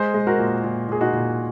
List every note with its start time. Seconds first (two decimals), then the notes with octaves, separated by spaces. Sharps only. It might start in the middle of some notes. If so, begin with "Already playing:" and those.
Already playing: G#3 G#4 C5
0.14 G#3
0.27 F#4 A#4
0.39 A#2
0.64 A#2
0.89 A#2 G#4
1.01 D#4 F#4
1.13 A#2